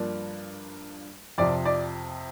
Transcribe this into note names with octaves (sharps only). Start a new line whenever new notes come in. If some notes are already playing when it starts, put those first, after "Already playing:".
Already playing: G2 F3 A#3 D4
F2 C3 F3 D5
D5